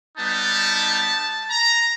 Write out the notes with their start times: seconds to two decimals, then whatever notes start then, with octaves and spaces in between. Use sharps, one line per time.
0.17 G3 B3 D#4 A5
1.49 A#5